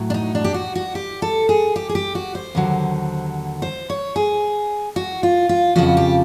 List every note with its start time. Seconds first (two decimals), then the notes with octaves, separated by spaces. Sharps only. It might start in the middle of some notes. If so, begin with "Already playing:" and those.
Already playing: A2 F#3
0.10 D4
0.14 D#4
0.35 D4
0.44 G4
0.54 F#4
0.75 F#4
0.95 G4
1.22 A4
1.49 G#4
1.76 G4
1.89 G#4
1.95 G4
2.15 F#4
2.35 C5
2.55 D#2 D3 F#3
3.62 C5
3.90 C#5
4.16 G#4
4.96 F#4
5.23 F4
5.49 F4
5.76 F2 C#3 F3 F#4
5.97 G4